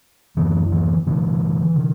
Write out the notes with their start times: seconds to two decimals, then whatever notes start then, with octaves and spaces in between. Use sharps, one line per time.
0.37 F#2 D3 E3
0.72 E3
1.06 G2 D3 E3
1.76 D3